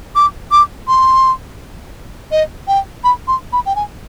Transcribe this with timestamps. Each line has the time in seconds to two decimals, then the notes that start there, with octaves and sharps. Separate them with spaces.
0.15 D6
0.51 D6
0.88 C6
2.31 D#5
2.67 G5
3.04 B5
3.27 C6
3.53 B5
3.66 G5
3.76 G#5